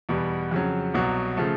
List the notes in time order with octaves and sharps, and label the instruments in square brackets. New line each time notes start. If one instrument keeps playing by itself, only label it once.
[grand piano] E2 B2 G3
F2 C#3 F#3
C2 B2 F#3
C#3 F3 A3